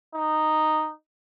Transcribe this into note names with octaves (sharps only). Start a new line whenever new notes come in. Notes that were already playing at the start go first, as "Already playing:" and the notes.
D#4